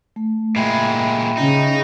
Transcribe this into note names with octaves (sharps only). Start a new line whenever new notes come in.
A3
A#2 G#3 E5 G5 B5
C#3 D#4